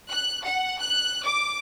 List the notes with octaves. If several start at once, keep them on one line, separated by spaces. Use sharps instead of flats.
F#6
F#5
F#6
D6